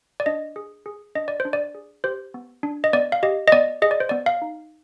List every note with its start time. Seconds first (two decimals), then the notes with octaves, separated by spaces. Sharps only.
0.20 D5
0.26 D4 D#5
0.56 G#4
0.86 G#4
1.15 D4 D#5
1.28 D5
1.40 C5
1.45 D4
1.53 D5
1.75 G#4
2.04 G4 C5
2.34 B3
2.63 D4
2.84 D#5
2.93 B3 D5
3.12 F5
3.23 G4 D#5
3.48 D#5
3.52 B3 D5
3.82 G#4 D#5
3.91 D5
4.00 C5
4.09 B3 D5
4.26 F5
4.42 D#4